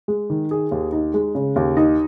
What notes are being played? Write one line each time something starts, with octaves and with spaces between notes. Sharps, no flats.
G#3
D#3
G#4
D#2
D#4
G#3
C#3
D#2
D#4